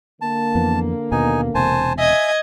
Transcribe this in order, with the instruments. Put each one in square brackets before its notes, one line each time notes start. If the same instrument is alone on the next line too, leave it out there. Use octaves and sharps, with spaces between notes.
[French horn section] D3 A#3 [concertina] A5
[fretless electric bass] F2 E3 B3
[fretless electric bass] D#2 B2 B3 [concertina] D#4 G#5
[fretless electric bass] E1 C3 [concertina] C5 G#5 A5
[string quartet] D#5 G#6 [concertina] E5 G#5